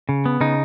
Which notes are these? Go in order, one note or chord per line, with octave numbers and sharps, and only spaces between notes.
C#3
B3
C#3 D#4